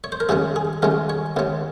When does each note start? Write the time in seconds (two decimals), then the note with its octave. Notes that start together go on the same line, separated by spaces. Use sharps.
0.04 C#5
0.12 C5
0.20 A#4
0.29 D#2 C#3 G#3 C#4 G#4
0.56 G#4
0.82 D#2 C#3 G#3 C#4 A#4
1.10 C#5
1.36 D#2 C#3 G#3 C#4